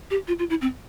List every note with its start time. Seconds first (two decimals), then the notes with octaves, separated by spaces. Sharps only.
0.11 G4
0.28 F4
0.39 F4
0.50 E4
0.61 C4